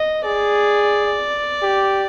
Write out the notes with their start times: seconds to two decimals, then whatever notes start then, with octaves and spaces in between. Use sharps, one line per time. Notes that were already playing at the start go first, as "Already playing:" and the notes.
Already playing: D#5
0.25 G#4 D5
1.62 G4